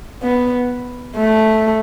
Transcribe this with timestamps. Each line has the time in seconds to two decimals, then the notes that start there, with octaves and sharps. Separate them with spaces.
0.23 B3
1.16 A3